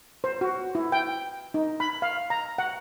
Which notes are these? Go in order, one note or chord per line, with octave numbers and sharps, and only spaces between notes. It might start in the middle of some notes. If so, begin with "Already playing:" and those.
C5
F#4
E4
G5
D#4
B5
F5
A#5
F#5